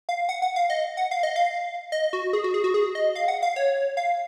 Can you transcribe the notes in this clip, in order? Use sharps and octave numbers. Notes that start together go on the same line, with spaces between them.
F5
F#5
F#5
F5
D#5
F#5
F5
D#5
F5
D#5
F#4
G#4
F#4
G#4
F#4
G#4
D#5
F5
F#5
F5
C#5
F5